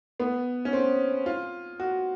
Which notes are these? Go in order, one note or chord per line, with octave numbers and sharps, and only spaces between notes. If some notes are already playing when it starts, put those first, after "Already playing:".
B3
C#4
C4
F4
F#4